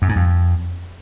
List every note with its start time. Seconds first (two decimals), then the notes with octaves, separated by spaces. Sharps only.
0.02 F#2
0.09 G#2
0.16 F2